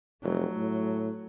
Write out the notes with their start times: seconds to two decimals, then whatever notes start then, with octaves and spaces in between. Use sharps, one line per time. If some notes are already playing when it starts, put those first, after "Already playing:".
0.23 F1 F#3 A3
0.56 A2